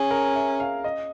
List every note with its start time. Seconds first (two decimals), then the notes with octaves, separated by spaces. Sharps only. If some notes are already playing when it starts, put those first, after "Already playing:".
Already playing: C#4 G#4
0.11 A#4
0.35 E5
0.60 F5
0.84 D#5